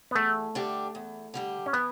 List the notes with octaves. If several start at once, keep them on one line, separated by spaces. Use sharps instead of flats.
B3
E2 A3
D3 G3 D4 G4
E2
D3 G3 D4 G4
C#4
E3 B3